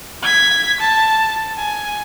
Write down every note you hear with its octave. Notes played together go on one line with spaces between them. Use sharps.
G#6 B6
A5
G#5